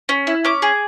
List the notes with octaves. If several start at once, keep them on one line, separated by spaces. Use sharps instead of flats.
C#4
E4
C#4 D6
G#4